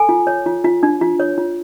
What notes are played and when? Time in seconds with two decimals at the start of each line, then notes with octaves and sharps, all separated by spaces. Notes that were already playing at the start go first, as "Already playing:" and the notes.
Already playing: A4 G#5
0.09 F4
0.27 C#5
0.46 F4
0.64 F4
0.83 D4
1.01 F4
1.20 C#5
1.38 F4